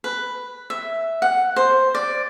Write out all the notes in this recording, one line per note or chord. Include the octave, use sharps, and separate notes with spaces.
B4
E5
F#5
C5
D5